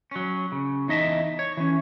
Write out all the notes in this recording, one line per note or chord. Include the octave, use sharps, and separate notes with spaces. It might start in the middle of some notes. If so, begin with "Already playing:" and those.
F#3 C#4
C#3
E2 D#4 D#5 E5 A5
C#5
E3 C#4